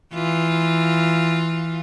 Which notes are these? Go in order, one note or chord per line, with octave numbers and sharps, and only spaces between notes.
E3 F4